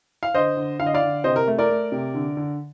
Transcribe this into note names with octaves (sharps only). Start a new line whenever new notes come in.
F5
D3 C5 D#5
D3
D3 F5
D#5
D5 F5
D3
C3 C5 D#5
A#4
A3
A#4 D5
A3
C3
D3
D3